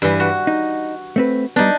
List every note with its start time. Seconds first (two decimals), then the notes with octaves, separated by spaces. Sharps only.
0.02 G2 E3
0.20 F#4
0.47 D#4
1.16 A3 C4 B4
1.56 G3 B3 D4 D#4